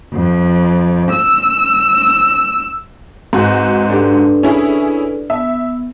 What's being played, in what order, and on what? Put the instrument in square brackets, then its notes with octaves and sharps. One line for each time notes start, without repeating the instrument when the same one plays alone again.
[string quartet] F2
E6
[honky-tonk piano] G#2 F#4 [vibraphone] C4 B4 D#5
[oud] D4 G4 [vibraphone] A4 B4 D5
[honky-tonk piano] C#4 E4 G#4
[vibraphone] B3 [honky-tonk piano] E5